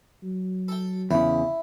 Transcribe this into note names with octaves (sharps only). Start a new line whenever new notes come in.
F#3
A4 G5
E2 C#3 E4